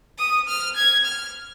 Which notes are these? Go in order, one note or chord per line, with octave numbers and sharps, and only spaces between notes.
D#6
F6
G#6
F6